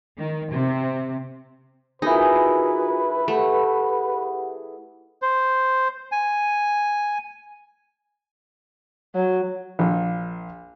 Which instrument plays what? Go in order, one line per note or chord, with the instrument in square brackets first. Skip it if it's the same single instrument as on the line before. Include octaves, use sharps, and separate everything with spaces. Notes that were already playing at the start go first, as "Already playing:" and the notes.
[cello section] D#3
C3
[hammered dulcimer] E3 G#4 [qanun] D#4 [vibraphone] F4 F#4 A#4 [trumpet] B4
[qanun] A3 [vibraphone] G4 F#5
[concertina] C5
G#5
[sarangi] F#3
[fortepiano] A#1